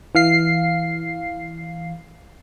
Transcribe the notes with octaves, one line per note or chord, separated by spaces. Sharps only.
E3 F5 C7